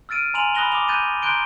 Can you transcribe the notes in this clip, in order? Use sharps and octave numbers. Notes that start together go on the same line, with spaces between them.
E6 F6 A6 D7 D#7
G#5 A#5 C6 D#7 F7 F#7
B5 D#6 F#6 A#6 F7 G7
D6 D#6 F7
F#6 G6 A6 D#7
A#5 C6 F#6 G6 D7 G7